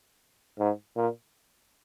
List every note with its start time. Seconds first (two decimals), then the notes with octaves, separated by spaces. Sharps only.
0.59 G#2
0.96 A#2